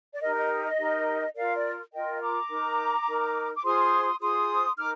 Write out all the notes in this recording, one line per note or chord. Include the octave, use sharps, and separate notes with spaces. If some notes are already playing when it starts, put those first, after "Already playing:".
D5
D#4 G4 A#4 D#5
D#5
D#5
D#4 G4 A#4
F4 A#4 D5 F5
D5
F4 A#4 D#5 G5
A#5 D6
D#4 A#4
D#4 A#4
D6
F4 G#4 C5 C6 D#6
F4 G#4 C5 C6 D#6
D#4 A#4 D6 F6